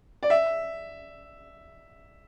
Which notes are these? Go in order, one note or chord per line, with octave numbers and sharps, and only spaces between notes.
D5
E5